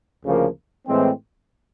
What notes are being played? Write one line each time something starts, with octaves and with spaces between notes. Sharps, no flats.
D2 C#3 F3 A#3
A2 E3 G#3 C4